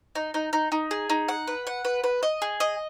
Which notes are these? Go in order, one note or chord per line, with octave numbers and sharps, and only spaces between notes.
D#4
D#4
D#4
D#4
G#4
D#4
F#5
B4
F#5
B4
B4
D#5
G#4
D#5